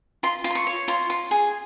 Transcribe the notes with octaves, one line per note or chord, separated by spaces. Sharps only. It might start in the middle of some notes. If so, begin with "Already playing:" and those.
F4 C6
F4
C6
C#6
C#5
F4 C6
F4
G#4